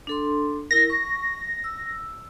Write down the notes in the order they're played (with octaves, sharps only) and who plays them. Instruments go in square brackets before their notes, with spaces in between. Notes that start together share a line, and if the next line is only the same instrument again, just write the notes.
[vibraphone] D4 A4 C6
[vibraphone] E4 A#4 [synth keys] A#6
[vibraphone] C#6
E6